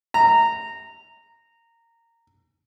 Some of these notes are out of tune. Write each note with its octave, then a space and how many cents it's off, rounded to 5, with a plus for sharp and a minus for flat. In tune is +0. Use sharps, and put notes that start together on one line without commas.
A#5 -15